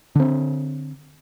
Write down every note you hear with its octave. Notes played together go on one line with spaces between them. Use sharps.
D3 C4